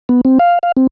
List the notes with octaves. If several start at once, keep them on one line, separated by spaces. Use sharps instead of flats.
B3
C4
F5
F5
C4